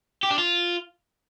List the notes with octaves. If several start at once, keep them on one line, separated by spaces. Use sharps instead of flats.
G4
D4
F4